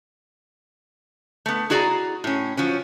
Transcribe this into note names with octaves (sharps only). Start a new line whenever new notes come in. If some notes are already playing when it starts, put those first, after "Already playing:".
A3 B3
E4 F#4 G#4 D5 A#5
A2 C#4
F3 F#3 C#4